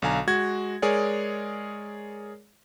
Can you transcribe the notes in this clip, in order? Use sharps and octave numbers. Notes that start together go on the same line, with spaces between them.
B1 D3 F5 G#5 A#5
G#3 F#4 G#6
G#3 G#4 A#4 C#5 D5